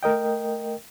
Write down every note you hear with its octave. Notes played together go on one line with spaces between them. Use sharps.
A3 A#4 D#5 G5